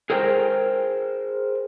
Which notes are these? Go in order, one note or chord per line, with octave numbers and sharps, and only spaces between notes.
G#4 A#4 C5 G5